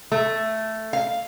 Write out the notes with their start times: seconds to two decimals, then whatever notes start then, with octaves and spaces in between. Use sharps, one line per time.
0.12 A3
0.93 F5